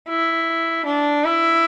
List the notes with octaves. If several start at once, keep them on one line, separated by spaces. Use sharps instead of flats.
E4
D4
E4